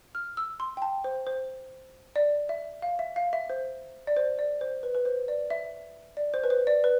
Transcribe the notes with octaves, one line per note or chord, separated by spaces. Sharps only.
F6
E6
C6
G5
A5
C5
C5
D5
E5
F5
E5
F5
E5
C5
D5
C5
D5
C5
B4
B4
C5
D5
E5
D5
C5
B4
C5
D5
B4